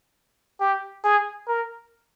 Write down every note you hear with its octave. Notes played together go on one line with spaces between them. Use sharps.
G4
G#4
A#4